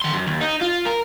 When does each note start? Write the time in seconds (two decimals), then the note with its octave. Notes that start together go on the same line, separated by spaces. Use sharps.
0.01 D#3 C6
0.14 F#2
0.27 D#2
0.41 D#4
0.62 F4
0.86 A#4